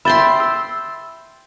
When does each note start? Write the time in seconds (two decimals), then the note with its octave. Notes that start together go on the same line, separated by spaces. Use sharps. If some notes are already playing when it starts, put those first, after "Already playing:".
0.05 E5 G5 B5 C6 A6
0.40 E6